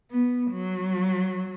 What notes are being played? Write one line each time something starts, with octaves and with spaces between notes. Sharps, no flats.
B3
F#3